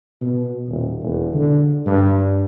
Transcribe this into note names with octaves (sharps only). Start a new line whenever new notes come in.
B2
D#1
E1
D3
G2